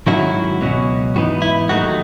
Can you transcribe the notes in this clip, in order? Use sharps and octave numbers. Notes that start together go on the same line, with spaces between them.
G#2 D#3 F#3 C#4 E4 F#4
C#2 B2 F#3 C#4
G#2 E3 B3 D#4 F#4
E4
D#2 D#3 F#3 A3 D#4 F#4